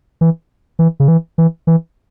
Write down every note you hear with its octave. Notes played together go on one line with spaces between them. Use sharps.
E3
E3
C#3
E3
E3
E3